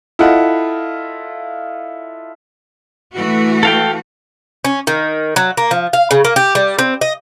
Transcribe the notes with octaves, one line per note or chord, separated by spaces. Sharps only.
E4 F4 A4 D#5 F#5
E3 A3 F#4
A4 F5 G5
C#4
D#3
F#3
A#3
F3
F5
C#3
A#3
G4
G3
C4
D#5